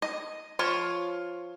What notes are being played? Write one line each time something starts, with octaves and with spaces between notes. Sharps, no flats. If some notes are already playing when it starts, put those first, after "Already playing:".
D#5
F3 F4 C#5